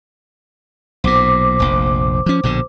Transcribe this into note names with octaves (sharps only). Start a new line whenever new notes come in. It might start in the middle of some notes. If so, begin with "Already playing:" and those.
B1 A#2 C5 D6
F1 A#1
F3 C#4
A#1 B2 D3